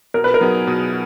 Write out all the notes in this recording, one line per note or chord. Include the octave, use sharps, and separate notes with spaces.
B2 A#4
B4
A#4
F#3 B3 D#4 G#4
B2